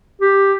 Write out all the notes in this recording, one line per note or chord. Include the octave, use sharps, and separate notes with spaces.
G4